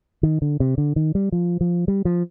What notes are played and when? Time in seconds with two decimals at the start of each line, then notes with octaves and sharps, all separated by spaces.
0.23 D#3
0.42 D3
0.60 C3
0.78 D3
0.96 D#3
1.15 G3
1.32 F3
1.61 F3
1.88 G3
2.05 F3